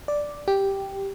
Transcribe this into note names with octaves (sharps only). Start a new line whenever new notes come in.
D5
G4